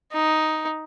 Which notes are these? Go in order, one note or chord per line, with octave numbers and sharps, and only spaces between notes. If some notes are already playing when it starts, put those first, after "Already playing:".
D#4